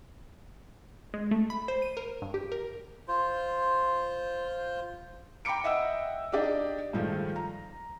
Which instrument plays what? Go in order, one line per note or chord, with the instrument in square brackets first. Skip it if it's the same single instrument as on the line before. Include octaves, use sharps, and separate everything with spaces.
[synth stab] G#3
A3
B5
C5
D#7
A#4
G2
G4
A#4
[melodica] F4 C5
[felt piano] G5 A#5 B5 D6 C#7 D7
D#5 E5 F#5 G5 E6
D4 D#4 G4 D5 D#5
G2 D#3 F3 G#3 A3
A#5